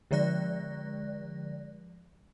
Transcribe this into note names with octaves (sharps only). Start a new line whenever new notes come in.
D3 F3 G#3 D5 F#6 A#6